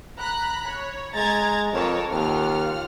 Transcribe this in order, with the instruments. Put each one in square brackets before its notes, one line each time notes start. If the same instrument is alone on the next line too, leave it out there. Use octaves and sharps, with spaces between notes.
[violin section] A#5 B5 F#6
C#5
[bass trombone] G#3 [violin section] A#5 G#6 A6
[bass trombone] F2 [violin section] A#4 C#5 A5
[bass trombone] D#2 [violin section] F4 F#5 F6